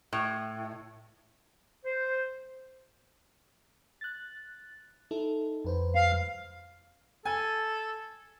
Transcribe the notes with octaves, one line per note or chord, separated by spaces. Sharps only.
A2
C5
F#6 A6
D#4 E4 A4
F2 B4 C5
F5
A4 G#5